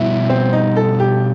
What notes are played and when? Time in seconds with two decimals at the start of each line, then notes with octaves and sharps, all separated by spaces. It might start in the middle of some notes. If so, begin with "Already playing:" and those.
Already playing: B2 G3 B3 E4 F#4
0.29 C4
0.53 D#4
0.76 A4
1.00 G4